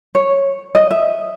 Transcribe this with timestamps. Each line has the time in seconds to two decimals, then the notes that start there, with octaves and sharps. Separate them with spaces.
0.15 C#5
0.75 D#5
0.91 E5